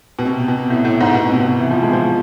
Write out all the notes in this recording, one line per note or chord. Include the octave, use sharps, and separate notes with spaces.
B2
C3
B2
A2
A2
G#2
B2
C3
B2
C3
E3
F3
G#3
F3